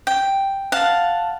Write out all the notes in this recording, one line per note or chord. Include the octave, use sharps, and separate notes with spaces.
G5
F5 F#5 A5